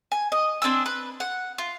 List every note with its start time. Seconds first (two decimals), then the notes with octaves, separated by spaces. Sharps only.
0.12 G#5
0.32 D#5
0.62 C4 D4 G#5 E6
0.86 B4
1.20 F#5
1.58 F4